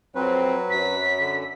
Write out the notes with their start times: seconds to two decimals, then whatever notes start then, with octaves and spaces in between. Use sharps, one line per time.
0.15 F2 F#3 C4 B4
0.70 F#2 B6
1.20 D3